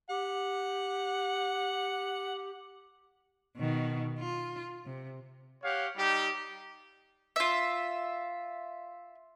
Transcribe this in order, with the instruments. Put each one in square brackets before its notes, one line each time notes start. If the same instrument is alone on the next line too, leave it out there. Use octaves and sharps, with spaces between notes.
[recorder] G4 [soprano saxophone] F#5
[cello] B2 D#3
F4
C3
[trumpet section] G4 C#5 F5 F#5
G3 D#4 G4
[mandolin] F4 E5